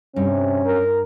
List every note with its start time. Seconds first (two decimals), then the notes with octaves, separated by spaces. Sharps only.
0.16 G2 C3 C#4
0.66 A#4